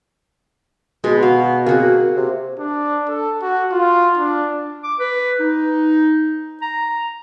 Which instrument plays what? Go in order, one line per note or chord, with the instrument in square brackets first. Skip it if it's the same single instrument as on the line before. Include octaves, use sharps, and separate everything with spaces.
[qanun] B2 [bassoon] G#3
[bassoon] F#4 [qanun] F5
[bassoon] A#3 [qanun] C4 F#4 G#4
[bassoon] C3
[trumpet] D4
A4
F#4
F4
D4
[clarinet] D6
B4
D#4
A#5